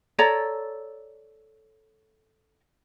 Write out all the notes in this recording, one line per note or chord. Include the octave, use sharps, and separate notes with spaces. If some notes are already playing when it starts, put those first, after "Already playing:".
A4 C#5 D5 A#5